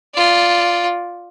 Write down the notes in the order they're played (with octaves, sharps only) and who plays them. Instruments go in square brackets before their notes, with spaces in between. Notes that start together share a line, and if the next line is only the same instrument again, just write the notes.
[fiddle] F4 D5